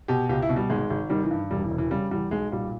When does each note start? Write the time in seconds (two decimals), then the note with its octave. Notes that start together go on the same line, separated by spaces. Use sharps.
0.08 B2 G4
0.29 C#2 G4
0.42 E4
0.49 B2
0.56 G3
0.70 G#1 G#3
0.90 G#1
1.10 D#3 G3
1.24 E3
1.31 G2
1.51 E1 G3
1.64 E3
1.71 E1
1.78 E3
1.91 C#3 G3
2.11 E2 G3
2.31 B1 G#3
2.52 A#2 G3